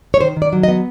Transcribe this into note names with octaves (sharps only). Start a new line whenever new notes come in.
C#5
D#3 C5
D#3
D5
F#3
D#5
B3